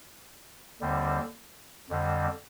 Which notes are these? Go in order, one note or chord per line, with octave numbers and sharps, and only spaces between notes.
D#2 D3 G3 C4
F2 D3 G3 C4